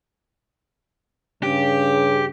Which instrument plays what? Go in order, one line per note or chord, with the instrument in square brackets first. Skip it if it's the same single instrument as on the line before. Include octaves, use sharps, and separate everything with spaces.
[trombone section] G2 C#3 [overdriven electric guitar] G4